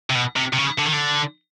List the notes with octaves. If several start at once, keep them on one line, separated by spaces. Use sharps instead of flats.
C3
B2
C3
C3
C#3
D3
D#3
D3